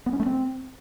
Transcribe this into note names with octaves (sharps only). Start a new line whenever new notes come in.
B3
C#4
A3
C4